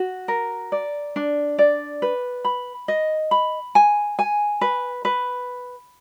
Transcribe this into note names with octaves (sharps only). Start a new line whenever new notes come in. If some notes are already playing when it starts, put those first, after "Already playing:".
Already playing: F#4
A#4
D5
D4
D5
B4
B5
D#5
B5
G#5
G#5
B4
B4